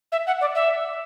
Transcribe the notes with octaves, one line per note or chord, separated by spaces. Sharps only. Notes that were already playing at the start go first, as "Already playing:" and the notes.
E5
F#5
D5
E5